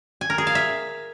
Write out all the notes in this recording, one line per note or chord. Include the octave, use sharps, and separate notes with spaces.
G#5
A#4
G#4
F5
E5